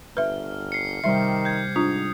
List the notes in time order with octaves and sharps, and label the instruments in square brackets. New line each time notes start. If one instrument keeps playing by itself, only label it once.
[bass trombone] G1 [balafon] B4 E5 [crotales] F6
[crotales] C7 C#7
[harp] C3 G3 C6 [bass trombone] D#3 [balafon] E5 [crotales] C7
[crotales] G6 G#6
[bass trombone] G#2 [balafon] D4 F4 [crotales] D#6